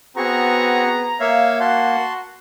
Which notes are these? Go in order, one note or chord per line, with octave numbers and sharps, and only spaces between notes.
B3 C4 F#4 G#4 A#5 C#6
A#3 C#5 E5 F5
F#4 F#5 A5 C6